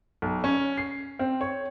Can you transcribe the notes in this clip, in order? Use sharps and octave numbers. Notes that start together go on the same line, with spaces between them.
B1
C#4
C7
C4
C#5